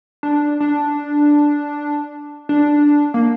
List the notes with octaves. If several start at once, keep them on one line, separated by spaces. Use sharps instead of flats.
D4
D4
D4
A#3